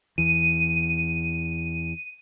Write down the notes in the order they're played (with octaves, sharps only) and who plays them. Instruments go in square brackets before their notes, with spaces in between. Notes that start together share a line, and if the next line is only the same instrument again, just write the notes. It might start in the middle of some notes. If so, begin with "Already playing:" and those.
[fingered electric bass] E2 E3 [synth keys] D#7